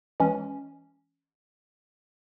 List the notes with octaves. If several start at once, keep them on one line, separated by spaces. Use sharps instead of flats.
E3 G#3 C#4